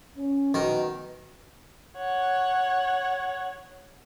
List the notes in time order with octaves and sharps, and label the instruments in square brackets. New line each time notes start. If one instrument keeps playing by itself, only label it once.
[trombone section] C#4
[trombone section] B2 B3 F#4 [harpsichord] D#3
[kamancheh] C#5 F#5